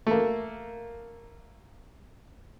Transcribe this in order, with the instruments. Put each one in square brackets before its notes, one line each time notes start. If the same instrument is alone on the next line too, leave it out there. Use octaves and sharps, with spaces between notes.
[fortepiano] A3 A#3